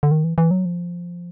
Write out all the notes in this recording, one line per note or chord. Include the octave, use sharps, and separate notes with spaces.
D3
D#3
E3
E3
F#3
F3